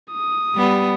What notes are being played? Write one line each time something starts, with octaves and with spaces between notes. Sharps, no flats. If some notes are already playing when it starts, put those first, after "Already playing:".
D#6
G3 B3